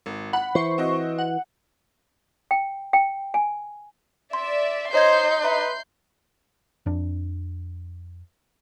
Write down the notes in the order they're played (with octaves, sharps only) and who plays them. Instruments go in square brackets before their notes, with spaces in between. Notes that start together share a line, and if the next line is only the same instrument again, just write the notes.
[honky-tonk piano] G#1
[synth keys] F#5 [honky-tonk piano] B5
[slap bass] E3 [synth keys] C5 C#6
[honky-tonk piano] C4 F#4 D#5
[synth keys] F#5
[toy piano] G5
G5
G#5
[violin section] D5 E5 [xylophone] C6
[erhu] D#4 [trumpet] C5 [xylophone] C#5 D#5 G#6 [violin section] C6 G6
[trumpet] B4 [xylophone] E5 A#5
[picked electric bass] F2 D4